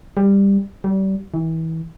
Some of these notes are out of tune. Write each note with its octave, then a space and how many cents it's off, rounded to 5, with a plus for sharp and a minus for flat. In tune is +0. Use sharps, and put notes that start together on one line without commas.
G3 +15
G3 -30
E3 -30